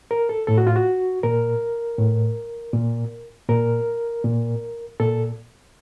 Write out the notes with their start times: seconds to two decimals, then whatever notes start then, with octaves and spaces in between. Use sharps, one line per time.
0.11 A#4
0.29 A4
0.47 A2 A4
0.58 F#4
0.67 F4
0.76 F#4
1.23 A#2 A#4
1.99 A2
2.73 A#2
3.49 A#2 A#4
4.24 A#2
5.00 A#2 A4